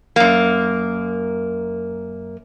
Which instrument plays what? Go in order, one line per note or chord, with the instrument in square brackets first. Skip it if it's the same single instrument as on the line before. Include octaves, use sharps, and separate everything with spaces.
[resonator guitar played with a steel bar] F#2 A#3